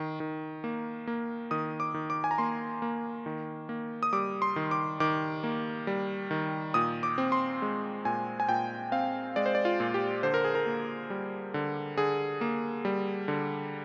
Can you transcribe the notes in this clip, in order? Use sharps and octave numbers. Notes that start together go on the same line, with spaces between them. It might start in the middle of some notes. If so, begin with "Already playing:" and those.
Already playing: D#3
D#3
A#3
A#3
D#3 D#6
D6
D#3
D6
G#5
A#5
A#3 C6
A#3
D#3
A#3
D#6
G3 D6
C6
D#3
D6
D#3 D6
A#3
G3
D#3
A#2 D#6
D6
C4
C6
G#3
A#2 G#5
G#5
A#2 G5
C4 F5
G#3 D5
C5
D5
F4
A#2
G4
D3 C5
A#4
G#4
A#4
A#3
G3
D3
D3 G#4
A#3
G3
D3